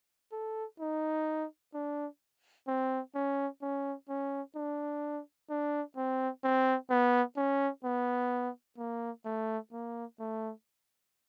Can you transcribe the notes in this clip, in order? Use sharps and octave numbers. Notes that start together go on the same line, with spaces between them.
A4
D#4
D4
C4
C#4
C#4
C#4
D4
D4
C4
C4
B3
C#4
B3
A#3
A3
A#3
A3